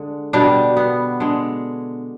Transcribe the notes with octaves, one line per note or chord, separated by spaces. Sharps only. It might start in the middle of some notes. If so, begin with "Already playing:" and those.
Already playing: D3 G#3
B2 G3 D4
B3
D3 G#3